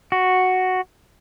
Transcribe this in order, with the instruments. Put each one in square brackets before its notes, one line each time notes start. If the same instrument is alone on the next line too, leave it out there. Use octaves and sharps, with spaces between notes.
[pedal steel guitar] F#4